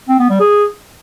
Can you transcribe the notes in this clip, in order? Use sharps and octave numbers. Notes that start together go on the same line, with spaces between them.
C4
B3
G3
G#4